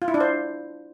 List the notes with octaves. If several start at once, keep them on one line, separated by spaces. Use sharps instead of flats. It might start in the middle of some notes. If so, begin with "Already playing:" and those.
F4
E4
D4
C5